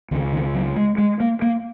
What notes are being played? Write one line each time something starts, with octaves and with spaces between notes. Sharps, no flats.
C#2 C#3 D#3
D#3
F#3
G#3
G#3
A#3
A#3